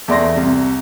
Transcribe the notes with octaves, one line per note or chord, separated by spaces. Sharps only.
E2 A3 D5 C6 A#6
C2 C3